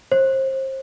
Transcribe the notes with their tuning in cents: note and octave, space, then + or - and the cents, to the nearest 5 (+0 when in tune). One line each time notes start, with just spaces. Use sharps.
C5 +30